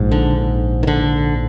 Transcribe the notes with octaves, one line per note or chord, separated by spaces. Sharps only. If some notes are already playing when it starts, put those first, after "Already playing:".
Already playing: A#1 G#2
D3
D#3
D3